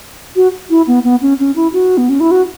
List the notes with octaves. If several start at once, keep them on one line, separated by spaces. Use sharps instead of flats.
F#4
E4
B3
B3
C#4
C#4
E4
F#4
B3
C#4
E4
F#4